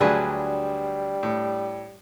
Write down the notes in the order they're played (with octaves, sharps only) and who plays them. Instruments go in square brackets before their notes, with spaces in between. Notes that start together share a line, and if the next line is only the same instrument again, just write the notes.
[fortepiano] D2 F#3 [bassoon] G3 [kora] D4 G#4 B4
[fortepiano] A2